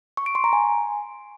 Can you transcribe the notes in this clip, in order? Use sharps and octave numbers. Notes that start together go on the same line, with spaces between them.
C#6
D7
C6
A#5
G#5